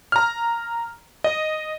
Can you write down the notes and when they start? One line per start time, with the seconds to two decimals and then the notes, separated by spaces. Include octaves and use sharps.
0.12 A#5 F6
1.24 D#5